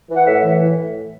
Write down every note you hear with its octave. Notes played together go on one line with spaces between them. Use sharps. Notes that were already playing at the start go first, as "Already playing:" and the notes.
E3
F#5
A2 E5
E3
A2